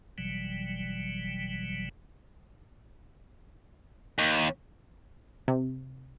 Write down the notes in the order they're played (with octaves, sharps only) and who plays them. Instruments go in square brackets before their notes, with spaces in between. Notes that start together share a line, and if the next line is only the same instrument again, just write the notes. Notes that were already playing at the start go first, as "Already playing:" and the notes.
[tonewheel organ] G1 B2 E3 F#3 G3
[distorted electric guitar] D#2
[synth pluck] C3